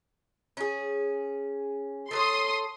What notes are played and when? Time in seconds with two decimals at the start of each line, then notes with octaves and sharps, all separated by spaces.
0.57 C#4 G#4
2.11 A4 B4 C#5 C6 D#6